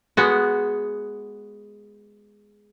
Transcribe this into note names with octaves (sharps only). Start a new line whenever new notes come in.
G#3 B3 F#4